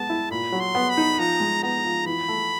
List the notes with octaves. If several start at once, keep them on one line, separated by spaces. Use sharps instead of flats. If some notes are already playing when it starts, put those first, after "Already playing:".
Already playing: G#3 B3 A5
E4
A#2 B5
F#3
C6
B3
B5
D#4
F3 A#5
G#3
B3 A#5
F3
E3 B5
A3